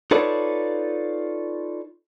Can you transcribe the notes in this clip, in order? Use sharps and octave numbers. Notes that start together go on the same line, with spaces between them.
D#4 F4 A4 B4 C#5 D5